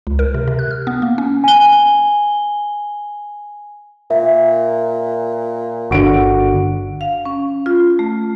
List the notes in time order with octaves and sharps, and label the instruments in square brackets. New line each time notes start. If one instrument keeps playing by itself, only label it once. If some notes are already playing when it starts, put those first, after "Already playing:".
[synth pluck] C#2
A#4
C3
C3
F#6
F6
B3
A#3
C#4
[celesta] G#5 G7
[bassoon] A#2 [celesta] E5
[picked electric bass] G1 D3 [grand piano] F#4 D7
[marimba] F5
C#4
F4
A3